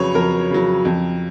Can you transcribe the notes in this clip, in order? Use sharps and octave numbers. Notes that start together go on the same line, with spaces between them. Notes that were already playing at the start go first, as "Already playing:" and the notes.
Already playing: F2 C#3 F#3 B4 C#5
F2 A#4
C#3 F#3
F2